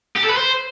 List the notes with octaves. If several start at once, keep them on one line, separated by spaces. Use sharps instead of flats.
G4
A4
B4
C5